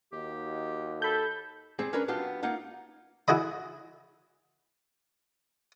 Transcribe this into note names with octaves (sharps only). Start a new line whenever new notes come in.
D#2 D#4 F#4 G4
A4 B5 G6
G3 C4 G#4
C#4 D4 A#4 B4
F#3 B3 D4 F4 G4
A#3 D#4 F4 F#5
E4 F#4 G#4 D#5 B5